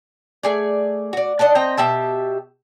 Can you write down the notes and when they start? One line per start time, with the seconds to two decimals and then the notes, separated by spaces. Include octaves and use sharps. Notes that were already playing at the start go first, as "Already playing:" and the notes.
0.43 A3 G#4 D5
1.13 F#4 D5
1.39 D5 D#5 F#5 A5
1.55 C4 D#5 G5 A#5
1.77 B2 G4 E5 A5